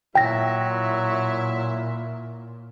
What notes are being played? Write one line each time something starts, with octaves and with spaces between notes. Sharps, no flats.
A#2 F#3 E4 E5 G5 A#6